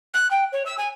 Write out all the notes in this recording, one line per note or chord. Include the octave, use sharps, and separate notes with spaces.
F#6
G5
C#5
E6
G#5